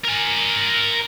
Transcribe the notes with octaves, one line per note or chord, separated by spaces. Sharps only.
A#4 G#5